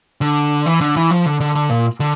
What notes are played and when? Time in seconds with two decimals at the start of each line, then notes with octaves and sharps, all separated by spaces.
0.21 D3
0.66 E3
0.81 D3
0.96 E3
1.11 F3
1.26 D3
1.40 D3
1.55 D3
1.70 A#2
2.00 D3